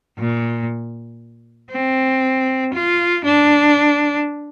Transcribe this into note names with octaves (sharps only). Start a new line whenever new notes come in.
A#2
C4
F4
D4